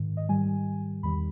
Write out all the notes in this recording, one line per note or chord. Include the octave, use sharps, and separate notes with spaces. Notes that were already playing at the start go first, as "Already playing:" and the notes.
Already playing: G#2 D#3
D#5
G#2 D#3 G3 G#5
E2 D#3 G3 B5